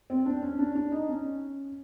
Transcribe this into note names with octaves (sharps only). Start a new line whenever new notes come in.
C4
D4
C#4
D4
D4
D#4
C#4